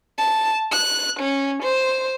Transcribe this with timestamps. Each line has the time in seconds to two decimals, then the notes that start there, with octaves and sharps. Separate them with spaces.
0.18 A5
0.72 F#6
1.20 C#4
1.63 C5